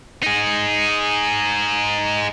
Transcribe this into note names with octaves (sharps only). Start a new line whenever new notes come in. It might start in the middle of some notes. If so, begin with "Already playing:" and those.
D#4 G#4